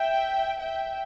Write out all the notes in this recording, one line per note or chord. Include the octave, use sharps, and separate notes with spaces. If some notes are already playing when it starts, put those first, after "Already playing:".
Already playing: E5 G5
E5 G5